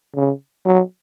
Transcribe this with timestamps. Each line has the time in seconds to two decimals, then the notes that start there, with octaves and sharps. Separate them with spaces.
0.16 C#3
0.65 F#3